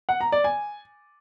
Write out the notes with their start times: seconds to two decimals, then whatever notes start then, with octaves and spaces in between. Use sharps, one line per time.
0.09 F#5
0.21 A#5
0.32 D5
0.44 G#5